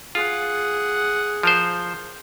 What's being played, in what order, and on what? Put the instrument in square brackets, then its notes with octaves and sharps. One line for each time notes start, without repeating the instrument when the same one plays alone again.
[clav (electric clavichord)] F4 [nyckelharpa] G#4 F#5
[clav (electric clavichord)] F3 A#4 C5